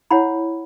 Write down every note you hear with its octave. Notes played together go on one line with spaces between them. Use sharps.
E4 C#5 F#5 B5